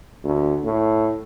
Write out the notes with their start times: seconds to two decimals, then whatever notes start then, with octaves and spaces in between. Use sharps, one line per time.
0.24 D2
0.64 A2